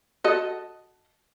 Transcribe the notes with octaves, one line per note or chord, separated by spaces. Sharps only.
F#4 A4 D#5